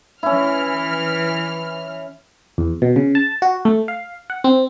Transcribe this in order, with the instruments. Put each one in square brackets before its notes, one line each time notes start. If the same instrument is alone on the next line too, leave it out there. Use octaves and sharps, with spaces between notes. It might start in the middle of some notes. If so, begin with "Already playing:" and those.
[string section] E3 F6 [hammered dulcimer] C#4 E4
[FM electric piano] E2
B2
C#3
A5
F#4
A3
F5
F#5
C4